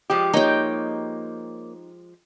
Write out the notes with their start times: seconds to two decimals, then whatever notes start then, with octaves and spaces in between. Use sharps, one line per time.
0.10 F3 G#3 G4
0.33 A#3 D#4 C#5 D#5 G5